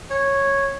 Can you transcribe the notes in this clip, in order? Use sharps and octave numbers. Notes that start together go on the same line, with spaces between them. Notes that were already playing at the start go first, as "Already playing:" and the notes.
C#5